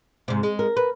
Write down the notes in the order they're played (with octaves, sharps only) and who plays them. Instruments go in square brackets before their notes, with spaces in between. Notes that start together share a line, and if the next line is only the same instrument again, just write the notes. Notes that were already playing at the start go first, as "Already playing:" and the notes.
[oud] G#2 C3
G#3
[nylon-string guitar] A#4
[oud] B4